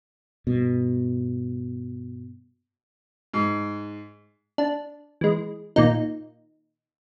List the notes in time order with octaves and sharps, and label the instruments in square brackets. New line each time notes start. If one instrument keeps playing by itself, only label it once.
[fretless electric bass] G2 B2
[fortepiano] G#2
[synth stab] D4
E3 G#3
A#2 D#3 D#4